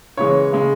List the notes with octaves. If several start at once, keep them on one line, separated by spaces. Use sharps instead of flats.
C#3 E3 G#3 C#5
C#3 G#3